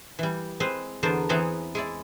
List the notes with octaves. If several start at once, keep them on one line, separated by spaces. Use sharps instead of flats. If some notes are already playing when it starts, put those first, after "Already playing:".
E3 G3
G#3 C4 B4 C5
E2 D3 B3 A#4 C5 A5
E3 B3 C4 G#4 F#5 A#5
G#3 E4 D5